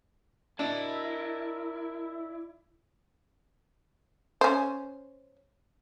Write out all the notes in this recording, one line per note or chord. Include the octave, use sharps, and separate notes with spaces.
D4 E4 A#4 D#5 A5
C#4 C5